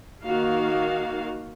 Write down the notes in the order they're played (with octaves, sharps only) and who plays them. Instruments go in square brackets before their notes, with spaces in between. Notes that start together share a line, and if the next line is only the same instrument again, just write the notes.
[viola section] D#3 A#3 F#4 F5